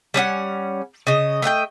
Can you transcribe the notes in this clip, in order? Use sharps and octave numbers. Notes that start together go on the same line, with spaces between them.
G3 C#4 D4 F#5
C#3 D#5
A3 D#5 F#5 G5